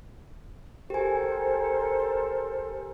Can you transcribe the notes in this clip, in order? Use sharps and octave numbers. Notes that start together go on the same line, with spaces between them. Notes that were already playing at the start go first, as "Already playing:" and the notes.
G4 A4 A#4 C5 G#5